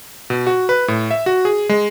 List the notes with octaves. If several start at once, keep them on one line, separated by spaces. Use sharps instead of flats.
B2
F#4
B4
A2
E5
F#4
G#4
G#3